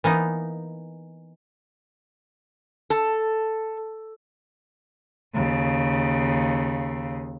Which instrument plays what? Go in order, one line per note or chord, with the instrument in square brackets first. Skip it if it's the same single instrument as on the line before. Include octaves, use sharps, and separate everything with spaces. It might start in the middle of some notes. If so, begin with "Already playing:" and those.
[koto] E3 A#3 B3 D#4
[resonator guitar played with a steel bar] A4
[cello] D#2 C#3